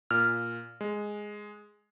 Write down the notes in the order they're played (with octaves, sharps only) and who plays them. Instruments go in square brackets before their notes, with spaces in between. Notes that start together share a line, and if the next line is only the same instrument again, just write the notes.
[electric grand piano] A#2 [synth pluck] F6
[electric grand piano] G#3